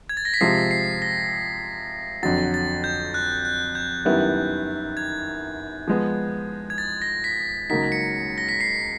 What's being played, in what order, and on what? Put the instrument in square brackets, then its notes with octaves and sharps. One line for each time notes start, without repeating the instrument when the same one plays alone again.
[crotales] G#6
A6
A#6
B6
[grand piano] C3 F3 G#3 C4 F4 [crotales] C7
[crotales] C7
A#6
[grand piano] F2 D3 F#3 [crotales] A6
[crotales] A6
G6
F#6
F#6
G6
[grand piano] F#2 D#3 G3 B3 E4
[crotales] G#6
[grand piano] F3 G#3 B3
[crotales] G#6
A6
A#6
B6
[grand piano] C#2 C#3 F#3 A#3 D#4 [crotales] B6
[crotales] C#7
A#6
B6
C7